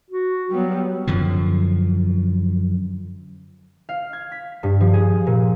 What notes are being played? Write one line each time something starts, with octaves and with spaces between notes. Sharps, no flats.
F#4
F#3 G3 B3
F#2 D3 F3
F5
G#6
B6
G2
F3
G#4
A#2